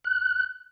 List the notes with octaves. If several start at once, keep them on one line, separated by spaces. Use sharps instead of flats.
F#6